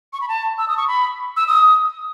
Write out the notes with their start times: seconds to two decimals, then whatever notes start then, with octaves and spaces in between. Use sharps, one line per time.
0.13 C#6
0.21 B5
0.28 A5
0.58 E6
0.68 D#6
0.77 C#6
0.88 B5
1.37 E6
1.47 D#6